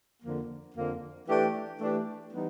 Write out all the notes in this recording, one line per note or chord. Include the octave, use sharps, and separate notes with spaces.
F2 D3 F3 A#3
F2 D3 F3 A#3
E3 A3 D4 G4
E3 A3 D4 G4
E3 G3 B3 D#4